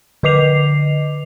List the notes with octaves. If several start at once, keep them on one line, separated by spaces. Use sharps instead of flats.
D3 B4 D#5 D6 C7 F7